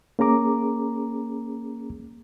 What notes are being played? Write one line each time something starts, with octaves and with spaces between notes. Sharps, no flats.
A#3 C#4 G#4 A#5 D6